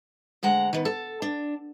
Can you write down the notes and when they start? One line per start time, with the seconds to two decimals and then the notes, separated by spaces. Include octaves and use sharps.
0.43 D2 G#3 F#5 A#5
0.73 D#3 B3
0.85 A4
1.22 D4